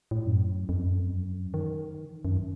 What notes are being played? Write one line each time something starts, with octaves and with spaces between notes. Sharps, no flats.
A2
F#2
F2
F#2
D#3
F#2